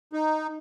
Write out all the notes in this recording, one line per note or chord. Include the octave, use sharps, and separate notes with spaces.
D#4